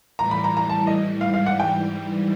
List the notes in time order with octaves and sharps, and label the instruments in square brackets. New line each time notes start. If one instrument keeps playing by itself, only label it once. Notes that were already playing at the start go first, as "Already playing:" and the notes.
[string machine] A2 E3 G3 [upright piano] A#5
[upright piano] B5
A#5
A#5
A5
D#5
[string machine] G#2 E3 G3 [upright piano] F5
[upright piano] F5
F#5
G5